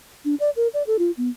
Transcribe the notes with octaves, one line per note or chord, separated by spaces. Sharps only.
D4
D5
A#4
D5
A4
F4
B3